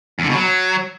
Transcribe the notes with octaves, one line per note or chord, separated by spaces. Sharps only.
E2
D3
B2
F#3